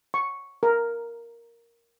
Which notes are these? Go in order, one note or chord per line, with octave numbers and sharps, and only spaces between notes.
C#6
A#4